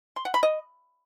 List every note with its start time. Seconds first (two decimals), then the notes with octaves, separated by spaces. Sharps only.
0.16 C6
0.25 F#5
0.34 B5
0.43 D#5